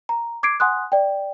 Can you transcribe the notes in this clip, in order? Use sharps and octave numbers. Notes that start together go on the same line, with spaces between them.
A#5
D6 G#6 C7 D7
F#5 G#5 C6 D#6 F#6
D5 G5